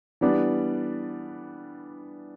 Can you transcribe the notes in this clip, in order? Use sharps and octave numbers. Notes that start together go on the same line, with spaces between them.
E3 G3 B3 D4